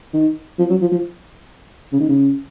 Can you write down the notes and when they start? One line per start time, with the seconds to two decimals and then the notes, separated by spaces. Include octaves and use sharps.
0.13 D#3
0.59 F3
0.70 F#3
0.81 F3
0.92 F3
1.92 C#3
2.00 D#3
2.09 C#3